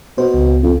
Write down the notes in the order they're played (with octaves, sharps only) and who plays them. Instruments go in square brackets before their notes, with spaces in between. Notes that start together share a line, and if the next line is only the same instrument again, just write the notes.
[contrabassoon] B2 [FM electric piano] C5
[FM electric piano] C#2
[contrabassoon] F2